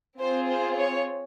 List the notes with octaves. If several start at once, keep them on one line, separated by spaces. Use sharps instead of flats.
C4 F4 G#4 C5
C5
C#5